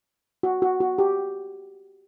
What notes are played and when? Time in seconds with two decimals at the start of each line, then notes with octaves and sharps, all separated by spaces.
0.43 F#4
0.62 F#4
0.80 F#4
0.98 G4